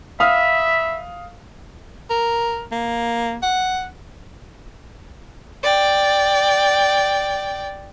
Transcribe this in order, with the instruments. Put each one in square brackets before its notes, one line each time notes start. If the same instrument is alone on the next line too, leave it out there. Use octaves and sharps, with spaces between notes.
[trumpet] E5 [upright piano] F5 D#6 F6 [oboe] B5
[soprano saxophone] A#4
A#3
F#5
[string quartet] D5 G5